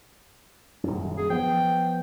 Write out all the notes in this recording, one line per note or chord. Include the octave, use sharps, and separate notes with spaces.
D#1 F#2
G#4
F3 B3 G5